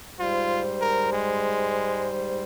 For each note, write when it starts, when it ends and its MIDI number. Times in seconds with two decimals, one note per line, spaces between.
0.19 2.43 44
0.19 2.43 55
0.19 0.62 65
0.19 2.43 72
0.81 1.10 70
1.13 2.13 56